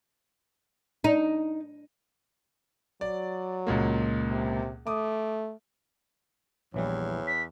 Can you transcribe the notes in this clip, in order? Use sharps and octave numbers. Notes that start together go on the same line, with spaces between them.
D#4
F#3 D5
C#2 A#2 A#3
C3
A3 D6 D#6
A#1 E2 E3 G3 C#5
B6